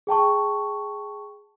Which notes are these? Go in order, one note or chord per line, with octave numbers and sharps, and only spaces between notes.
G#4 G5 A5 C#6